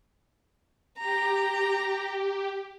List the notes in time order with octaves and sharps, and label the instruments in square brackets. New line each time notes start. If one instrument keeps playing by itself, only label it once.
[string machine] G4 [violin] A#5